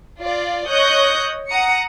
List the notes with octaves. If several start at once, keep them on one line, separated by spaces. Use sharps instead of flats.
F4 D5
C#5 D#5 C#6 D#6 F#6 G6
F#5 A#5 D#6 C#7